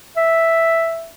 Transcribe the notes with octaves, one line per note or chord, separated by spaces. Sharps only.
E5